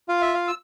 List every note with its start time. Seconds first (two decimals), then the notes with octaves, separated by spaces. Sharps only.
0.08 F4 F5
0.22 E5
0.34 F5
0.48 E6